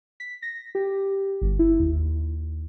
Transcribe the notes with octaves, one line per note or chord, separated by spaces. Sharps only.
B6
A#6
G4
G1
E4
D#2